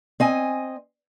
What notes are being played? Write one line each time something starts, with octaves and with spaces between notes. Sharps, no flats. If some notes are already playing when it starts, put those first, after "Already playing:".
C4 D#5 G#5